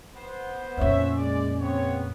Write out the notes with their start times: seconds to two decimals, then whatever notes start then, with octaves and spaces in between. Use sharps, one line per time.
0.15 B3 C5
0.77 F2 A#2 C#4 C#5 E5
1.16 G#3 D5
1.59 C#3 B3 C4 C#5